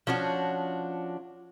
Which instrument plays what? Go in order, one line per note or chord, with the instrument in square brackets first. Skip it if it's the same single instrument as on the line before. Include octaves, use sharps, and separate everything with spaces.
[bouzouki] F3 C#4 D4 F#4